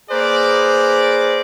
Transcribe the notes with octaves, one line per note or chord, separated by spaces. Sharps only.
A#3 G#4 B4 C5 D5